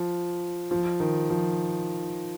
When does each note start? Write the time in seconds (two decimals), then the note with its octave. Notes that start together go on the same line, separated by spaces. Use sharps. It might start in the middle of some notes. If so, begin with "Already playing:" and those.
Already playing: F3
0.71 F3
1.00 D#3
1.30 F3